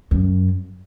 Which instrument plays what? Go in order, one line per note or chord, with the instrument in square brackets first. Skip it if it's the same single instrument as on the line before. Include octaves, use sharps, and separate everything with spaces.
[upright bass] F#2